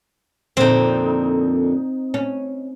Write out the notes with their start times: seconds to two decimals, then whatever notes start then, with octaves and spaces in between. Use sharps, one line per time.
0.57 F2 A#2 D3 C4 D#4
2.14 C#4